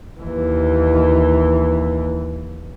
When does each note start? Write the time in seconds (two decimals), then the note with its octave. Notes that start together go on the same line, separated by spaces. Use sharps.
0.21 D#2 E3